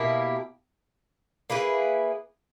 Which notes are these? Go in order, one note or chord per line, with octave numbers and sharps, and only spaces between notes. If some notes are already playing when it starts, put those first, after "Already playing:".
Already playing: B2 A#3 E4 G4
A#3 E4 G#4 B4